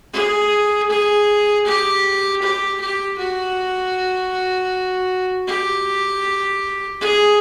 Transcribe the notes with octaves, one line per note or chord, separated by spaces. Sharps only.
G#4
G#4
G4
G4
G4
F#4
G4
G#4